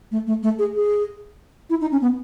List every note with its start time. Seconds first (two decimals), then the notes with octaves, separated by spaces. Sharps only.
0.11 A3
0.27 A3
0.43 A3
0.59 G#4
0.75 G#4
1.70 E4
1.81 D#4
1.92 C#4
2.02 B3